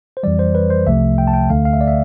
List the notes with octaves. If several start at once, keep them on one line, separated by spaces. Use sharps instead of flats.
C5
F2 E3 G3 D5
C5
B4
C5
C2 C3 F3 A3 E5
G5
A5
G5
D2 D3 A3 F5
F5
E5
D5
E5